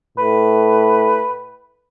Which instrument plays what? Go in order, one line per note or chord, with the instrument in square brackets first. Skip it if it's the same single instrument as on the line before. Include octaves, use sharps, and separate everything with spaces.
[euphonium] A2 [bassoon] B4